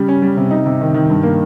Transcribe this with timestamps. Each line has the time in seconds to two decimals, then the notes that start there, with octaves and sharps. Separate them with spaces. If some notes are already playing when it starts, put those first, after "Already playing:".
Already playing: C#3 G3
0.08 C#4
0.22 G3
0.37 C3
0.51 D#4
0.66 C3
0.81 D#3
0.94 D#3
1.10 G2
1.23 A#3